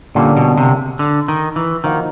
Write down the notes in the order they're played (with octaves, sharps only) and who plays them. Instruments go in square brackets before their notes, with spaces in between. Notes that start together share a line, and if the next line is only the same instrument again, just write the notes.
[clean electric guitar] A#2 [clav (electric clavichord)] D3 G3 A#3 C#4
[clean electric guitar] B2
C3
D3
D#3
E3
[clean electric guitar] D#3 [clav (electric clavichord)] F3 A#3 D#4 F#4